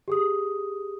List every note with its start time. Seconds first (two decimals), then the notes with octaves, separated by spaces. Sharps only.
0.08 G4 G#4 D#6